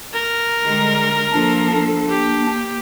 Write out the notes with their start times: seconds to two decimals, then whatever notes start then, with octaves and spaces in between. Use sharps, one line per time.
0.14 A#4
0.64 D3 G3 G#3
1.33 F3 A#3 D4 A4
1.73 D4
2.09 A#3 G4